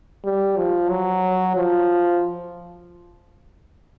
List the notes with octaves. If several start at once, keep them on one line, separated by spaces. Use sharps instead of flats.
G3
F3
F#3
F3